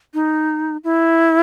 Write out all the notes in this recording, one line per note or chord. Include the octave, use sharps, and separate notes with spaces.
D#4
E4